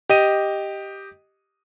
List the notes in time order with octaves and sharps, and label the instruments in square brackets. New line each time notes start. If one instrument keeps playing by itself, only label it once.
[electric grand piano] G4 D#5 D#7